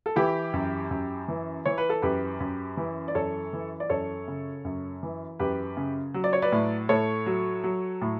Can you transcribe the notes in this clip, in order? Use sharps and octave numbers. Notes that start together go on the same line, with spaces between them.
A4
E3 E4 G4
F#2
F#2
E3
E3 C#5
B4
A4
F#2 G4 B4
F#2
E3
D5
F#2 A4 C#5
E3
D5
F#2 A4 C#5
C#3
F#2
E3
F#2 G4 B4
C#3
F#3
D5
C#5
B4 D5
A2
A2 A4 C#5
F#3
F#3
A2